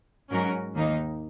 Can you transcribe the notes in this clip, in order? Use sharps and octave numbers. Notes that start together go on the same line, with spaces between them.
G#2 F#3 C#4 F#4 A#4
D#2 D#3 A#3 D#4